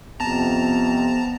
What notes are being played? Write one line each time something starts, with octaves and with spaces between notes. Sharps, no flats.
F2 C3 B3 A5 A#5